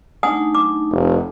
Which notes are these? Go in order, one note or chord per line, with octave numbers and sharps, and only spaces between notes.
A3 D4 D#4 F#5 G#5 D#6
D6
F1